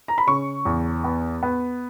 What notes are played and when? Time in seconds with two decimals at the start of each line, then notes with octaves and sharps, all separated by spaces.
0.08 A#5
0.18 B5
0.27 C#3 C#6
0.65 E2
1.04 B3
1.43 B3